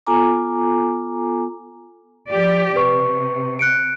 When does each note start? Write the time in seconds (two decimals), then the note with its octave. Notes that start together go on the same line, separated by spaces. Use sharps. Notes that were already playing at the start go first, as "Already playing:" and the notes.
0.07 B3 F4 A4 G#5 A#5 D6
2.28 F3 G4 D5
2.76 C3 B4 C#6
3.59 F#6 C#7 D7